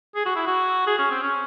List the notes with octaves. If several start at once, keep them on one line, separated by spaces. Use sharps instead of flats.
G#4
F#4
E4
F#4
G#4
C#4
C4
C#4